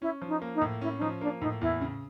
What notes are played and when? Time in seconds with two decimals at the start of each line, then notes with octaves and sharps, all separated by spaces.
0.01 C#4 E4
0.22 F3
0.28 D#4
0.42 A#3
0.55 D#4
0.62 A2
0.81 C#4 E4
0.98 D4
1.01 F3 D#4
1.21 A#3 D4
1.41 A2 D#4
1.61 E2 E4
1.81 C#3